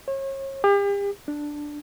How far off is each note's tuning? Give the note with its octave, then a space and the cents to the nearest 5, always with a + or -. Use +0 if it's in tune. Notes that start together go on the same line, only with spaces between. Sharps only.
C#5 -35
G4 +40
D4 +5